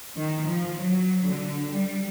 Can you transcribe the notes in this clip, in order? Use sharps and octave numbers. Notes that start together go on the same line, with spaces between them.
D#3
F3
F#3
D3
G3